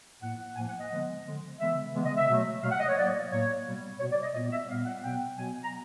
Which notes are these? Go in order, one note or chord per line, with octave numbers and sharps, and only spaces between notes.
A2 F3 A#3 F#5
A2 F3 A#3 G#5
F#5
D#5
D3 F3 G#3 B3
D3 F3 G#3 B3
C#3 E3 G#3 B3 E5
C#3 E3 G#3 B3
D#5
E5
B2 F#3 A3
B2 F#3 A3 F5
F#5
D#5
C#5
A2 F#3 A#3 D5
A2 F#3 A#3 C#5
B2 G3 B3
B2 G3 B3 C#5
D5
D#5
A#2 G3 B3 D#5
E5
A#2 G3 B3 F5
F#5
B2 F#3 B3 G5
B2 F#3 B3 G#5
A#5